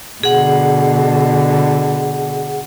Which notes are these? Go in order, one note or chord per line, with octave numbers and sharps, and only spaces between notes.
B2 D3 G#4 F#5